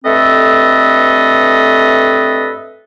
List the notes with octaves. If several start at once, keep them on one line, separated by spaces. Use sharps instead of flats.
G2 A3 C4 A4 B4 D#5